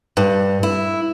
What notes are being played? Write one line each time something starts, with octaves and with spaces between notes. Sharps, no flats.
G2
E4